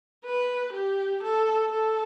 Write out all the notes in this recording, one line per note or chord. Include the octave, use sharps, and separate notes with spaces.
B4
G4
A4
A4